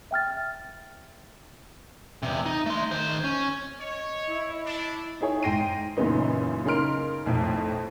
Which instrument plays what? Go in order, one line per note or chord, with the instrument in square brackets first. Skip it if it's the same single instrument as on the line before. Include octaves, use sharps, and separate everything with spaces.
[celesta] E5 G5 F6 A6
[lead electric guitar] E2 C3
D#4
A3 C6
D#3 C5
C#4
[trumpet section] C#5 [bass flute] D#5
[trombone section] E4
[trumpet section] D4
[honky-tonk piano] D#4 E4 G#4 C#5
G#2 G5 A#6 C7 D#7
F#2 A#2 C#3 E3 B3 D#4
C#3 D#4 A#4 C6 F6 D7
B1 F2 A2